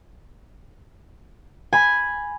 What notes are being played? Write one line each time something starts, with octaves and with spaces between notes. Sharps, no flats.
G#5 B5